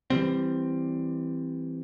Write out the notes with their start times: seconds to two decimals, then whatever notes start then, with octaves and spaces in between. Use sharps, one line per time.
0.10 E3 F#3 G3 C4